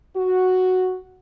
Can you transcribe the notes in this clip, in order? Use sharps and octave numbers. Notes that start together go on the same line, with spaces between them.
F#4